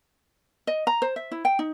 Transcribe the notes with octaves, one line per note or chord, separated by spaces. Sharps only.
D#5
A#5
C5
E5
E4
G5
D#4